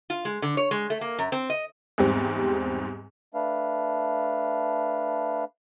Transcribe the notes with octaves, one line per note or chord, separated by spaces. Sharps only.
F4
G#3
D3
C#5
G#3
A3
A#3
F#2
C4
D#5
E2 G#2 G3 C4
A3 D4 B4 F5